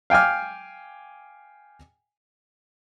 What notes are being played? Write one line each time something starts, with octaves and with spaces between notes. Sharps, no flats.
F5 G5 G#5 D6 F6